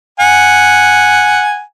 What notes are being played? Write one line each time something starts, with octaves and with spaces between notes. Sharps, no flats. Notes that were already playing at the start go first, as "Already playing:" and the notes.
F#5 G#5